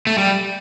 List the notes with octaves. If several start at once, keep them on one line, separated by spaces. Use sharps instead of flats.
A3
G3